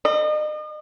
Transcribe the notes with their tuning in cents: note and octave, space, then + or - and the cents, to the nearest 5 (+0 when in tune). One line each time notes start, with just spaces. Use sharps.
D#5 -40